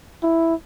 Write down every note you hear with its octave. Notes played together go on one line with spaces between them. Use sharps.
E4